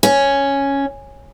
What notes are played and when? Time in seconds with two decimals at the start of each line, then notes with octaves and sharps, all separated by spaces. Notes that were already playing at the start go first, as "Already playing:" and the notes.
0.03 C#4